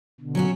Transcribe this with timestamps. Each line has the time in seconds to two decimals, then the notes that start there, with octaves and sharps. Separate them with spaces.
0.20 B2 D3
0.35 F#3 C#4 F#4